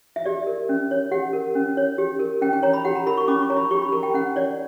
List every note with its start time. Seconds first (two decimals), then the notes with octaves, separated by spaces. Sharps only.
0.16 E5
0.25 G4 D5
0.47 A#4
0.69 C#4
0.91 C#5
1.11 G4 F#5
1.33 A#4
1.55 C#4
1.77 C#5
1.98 G4
2.19 A#4
2.41 C#4 G5
2.53 G5
2.63 C#5 A#5
2.73 B5
2.85 G4 F#5
2.95 A#5
3.07 A#4 B5
3.17 C#6
3.28 C#4 D6
3.42 C#6
3.50 C#5 A#5
3.57 B5
3.71 G4 C#6
3.82 B5
3.92 A#4 A#5
4.03 G5
4.14 C#4 F#5
4.36 C#5 D5